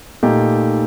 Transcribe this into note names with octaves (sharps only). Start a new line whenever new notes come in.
A#2 A3 D#4 G4